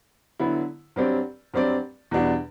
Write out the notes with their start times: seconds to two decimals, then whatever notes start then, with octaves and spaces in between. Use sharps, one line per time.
0.39 D3 F#3 B3 E4
0.96 G2 F#3 C4 G4 D5
1.54 G2 F#3 C4 G4 D5
2.11 E2 B2 G3 D4 F#4